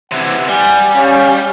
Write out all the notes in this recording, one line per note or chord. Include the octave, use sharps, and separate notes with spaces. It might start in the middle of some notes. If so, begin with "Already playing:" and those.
C3 E3 F#5
G3 G#5
C#4 F5